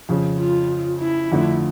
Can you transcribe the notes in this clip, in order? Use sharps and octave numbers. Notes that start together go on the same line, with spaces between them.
F2 C#3 F3
F4
E4
F2 D3 F3 A3 D4